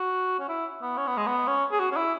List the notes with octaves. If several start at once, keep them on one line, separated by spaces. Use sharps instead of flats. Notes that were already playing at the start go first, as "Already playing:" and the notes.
Already playing: F#4
C#4
E4
B3
C#4
B3
G#3
B3
C#4
G#4
F#4
C#4
E4